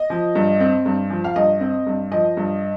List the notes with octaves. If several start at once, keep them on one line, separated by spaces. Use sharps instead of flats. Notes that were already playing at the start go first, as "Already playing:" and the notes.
Already playing: D#5
F3
G2
C4
G2
F3
F5
G2 D#5
C4
G2
F3 D#5
G2